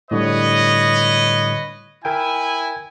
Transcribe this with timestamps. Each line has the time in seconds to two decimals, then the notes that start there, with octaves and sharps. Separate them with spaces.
0.11 A2 D3 G3 B4 C#5 D#5
2.05 E4 A#4 G5 G#5